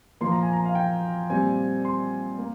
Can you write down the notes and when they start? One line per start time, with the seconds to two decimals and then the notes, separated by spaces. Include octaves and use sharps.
0.21 A#2 F3 A#3 C6
0.32 A#5
0.43 G#5
0.53 A#5
0.66 F5
0.75 G5
1.30 A#2 G3 C4 G#5
1.85 C6
2.39 A#3